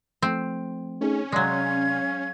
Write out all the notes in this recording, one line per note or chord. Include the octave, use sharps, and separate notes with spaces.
F3 A3 C4
A3 C#4 D#4 G#4
C3 F#3 G#3 D5 F5 C6 G#6